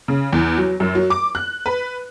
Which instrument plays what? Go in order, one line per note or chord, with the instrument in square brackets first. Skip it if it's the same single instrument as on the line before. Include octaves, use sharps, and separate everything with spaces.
[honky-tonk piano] C#3
E2
F#3
F#2
F#3
D6
F#6
B4